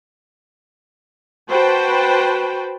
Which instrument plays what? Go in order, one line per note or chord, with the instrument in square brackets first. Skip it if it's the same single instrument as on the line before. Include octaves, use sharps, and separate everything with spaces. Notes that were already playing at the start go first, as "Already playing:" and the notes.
[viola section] F#4 B4 C5 G5 A5